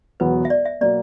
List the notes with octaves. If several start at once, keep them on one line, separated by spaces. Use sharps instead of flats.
E1 E2 B2 F#3 B3 B4
E5
D5
E5
B2 F#3 A#3 D5